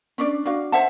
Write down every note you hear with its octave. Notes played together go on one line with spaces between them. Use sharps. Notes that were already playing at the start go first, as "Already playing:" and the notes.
C#4 D4 D5
D4 F#4 F5
C5 E5 F#5 A5